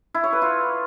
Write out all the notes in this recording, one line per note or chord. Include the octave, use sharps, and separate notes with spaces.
E4
C#5
B4
F4